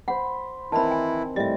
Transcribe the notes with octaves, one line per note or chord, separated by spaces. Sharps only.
C5 F#5 B5
D#3 E3 C4 E4 A5 B5
G#5
A2 G3 D#5 E5